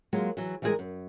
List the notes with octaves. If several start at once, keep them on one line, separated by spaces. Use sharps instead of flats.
F#3 G#3 A#3 F4 A#4
E3 F#3
E3 G3 G#3 D#4 G#4 A#4
F#2